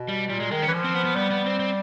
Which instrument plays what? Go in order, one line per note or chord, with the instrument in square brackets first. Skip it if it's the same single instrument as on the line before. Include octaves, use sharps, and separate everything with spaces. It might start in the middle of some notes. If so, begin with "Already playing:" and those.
Already playing: [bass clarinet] B2
[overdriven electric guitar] G3
[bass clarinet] A#2 [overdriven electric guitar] G3
[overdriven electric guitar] G#3
[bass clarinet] D#3 [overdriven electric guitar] G#3
[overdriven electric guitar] C#4
[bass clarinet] E3
F3
[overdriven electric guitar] C4
B3
B3
[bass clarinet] G3 [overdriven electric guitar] B3
[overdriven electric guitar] B3
C4
C4